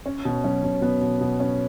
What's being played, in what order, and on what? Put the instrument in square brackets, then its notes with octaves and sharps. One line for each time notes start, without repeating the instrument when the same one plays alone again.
[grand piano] C#4 C#5
B2
F#3 C#4 C#5
B2
B2 B3 B4
B2
B2
C#4